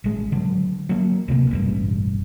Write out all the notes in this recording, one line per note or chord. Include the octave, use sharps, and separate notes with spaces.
A1 G#3
D3 F#3
F#3 A#3
D1 C3 A#3
E1 A1 G2